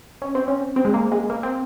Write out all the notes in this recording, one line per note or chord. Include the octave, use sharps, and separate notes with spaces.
C#4
C4
C#4
C4
G#3
A#3
G#3
A#3
C4